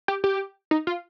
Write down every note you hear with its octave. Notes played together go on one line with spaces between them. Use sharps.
G4
G4
D#4
F4